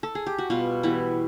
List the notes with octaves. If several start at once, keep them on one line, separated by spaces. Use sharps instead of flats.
A4
G#4
G4
F#4
B2 G3 B3 F4
E3 G3 B3 E4